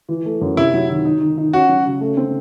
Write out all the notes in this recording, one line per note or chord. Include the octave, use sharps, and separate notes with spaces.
E3
A3
F#2
C3 E4
F#3
D#3
D#4
D#3
D#4
C#4 F#4
F#3
C#3
A3
C4